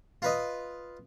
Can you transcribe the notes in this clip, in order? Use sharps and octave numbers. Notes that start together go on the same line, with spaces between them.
F4 B4 D#5